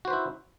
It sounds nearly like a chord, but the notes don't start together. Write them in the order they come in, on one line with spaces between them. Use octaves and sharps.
F#4 C5 B4 E4